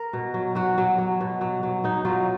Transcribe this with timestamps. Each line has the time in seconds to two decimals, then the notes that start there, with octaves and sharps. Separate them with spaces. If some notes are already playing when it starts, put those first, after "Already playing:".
Already playing: A#4
0.13 B2
0.34 F#3
0.55 F#3 F#4
0.78 F#3
0.98 F#3
1.20 B2
1.41 F#3
1.63 F#3
1.84 B2 D#4
2.05 F#3 F4